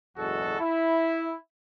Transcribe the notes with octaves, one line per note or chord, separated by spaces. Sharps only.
F#1 B1 E2 G#3 F#4 A4
E4